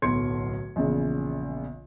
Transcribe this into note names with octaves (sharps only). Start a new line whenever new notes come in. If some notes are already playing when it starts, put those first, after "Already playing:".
D1 B1 A2 C6 G#6 C#7
A#1 E2 C#3